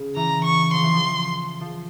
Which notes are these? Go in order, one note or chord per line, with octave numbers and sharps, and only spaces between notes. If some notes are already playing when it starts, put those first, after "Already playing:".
Already playing: C#3
E3 A#5
C#6
F3 C6
E3
F3
F3